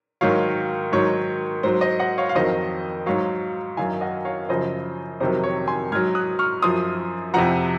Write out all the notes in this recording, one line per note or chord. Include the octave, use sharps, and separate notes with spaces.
G#2 D#3 F#3 C#5 F5
G#2 D#3 F#3 C#5
G#2 F#3 C5
C5 D#5
D#5 F#5
C#5 F5
F5
F2 D#3 F#3 C5 D#5
G#2 F#3 C#5 F5
F#2 D#3 F#3 F5 G#5
D#5 F#5
C#5 F5
F#2 C#3 F3 C5 D#5
F2 C3 D#3 F#3 C5
C#5
G#5 C6
G#2 F#3 F6 G#6
D#6 F#6
C#6 F6
F#2 F3 C6 D#6
F2 C3 F3 F#5 A#5